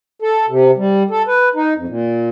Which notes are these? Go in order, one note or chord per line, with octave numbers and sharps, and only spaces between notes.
A4
C3
G3
A4
B4
D#4
F2
A#2